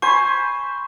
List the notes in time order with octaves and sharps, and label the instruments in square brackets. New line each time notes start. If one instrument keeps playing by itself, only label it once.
[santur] C5 G#5 B5 [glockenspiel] C#6